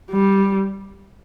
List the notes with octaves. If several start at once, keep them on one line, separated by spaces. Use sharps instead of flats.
G3